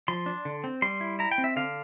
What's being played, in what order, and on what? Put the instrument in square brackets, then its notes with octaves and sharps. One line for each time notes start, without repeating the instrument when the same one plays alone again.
[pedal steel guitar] F3 C6
D4
D3
C4
G3 C6
E4
E4 A#5
G5
C4
E5
D3 F5